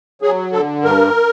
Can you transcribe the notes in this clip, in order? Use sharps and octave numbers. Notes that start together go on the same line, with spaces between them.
F#3 G#4
D3 A4
G2 A#4